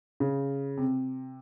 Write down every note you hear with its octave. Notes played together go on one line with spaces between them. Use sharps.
C#3
C3